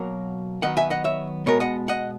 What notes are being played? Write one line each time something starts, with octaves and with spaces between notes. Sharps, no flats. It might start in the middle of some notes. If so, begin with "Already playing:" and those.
Already playing: B2 F#3 A#3 A#4 C#5
D#3 F#3 B3 D#5 F#5
E5 G#5
D#5 F#5
C#5 E5
B2 G#3 B3 A#4 C#5
D#5 F#5
D#5 F#5